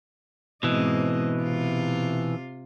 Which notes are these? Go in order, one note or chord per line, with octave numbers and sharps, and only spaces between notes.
G#2 B2 E3 C4 D#5
C3 F4